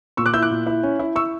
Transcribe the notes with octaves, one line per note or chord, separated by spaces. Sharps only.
A#2 C#6 E6
D6 F#6
E4 E6 G6
D6 F#6
A#2
E4
C#4
E4
E4 C#6 E6